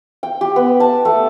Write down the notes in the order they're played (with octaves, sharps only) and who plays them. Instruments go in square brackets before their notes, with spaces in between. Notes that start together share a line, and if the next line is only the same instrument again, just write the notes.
[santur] G5
G4
B3
A5
A3